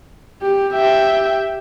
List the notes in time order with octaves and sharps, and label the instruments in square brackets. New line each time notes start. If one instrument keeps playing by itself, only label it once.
[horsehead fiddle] G4
[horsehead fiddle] G4 [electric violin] E5 G5